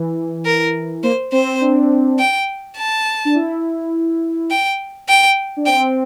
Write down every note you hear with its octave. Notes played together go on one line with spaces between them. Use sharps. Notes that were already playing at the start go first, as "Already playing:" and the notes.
Already playing: E3
A#4
A#3 C5
C4 C5
D4
G5
A5
D4
E4
G5
G5
D4
C4 G5